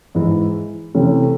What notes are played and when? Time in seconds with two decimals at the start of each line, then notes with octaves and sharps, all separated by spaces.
0.15 G#2 E3 G#3
0.94 C3 E3 A3 C#4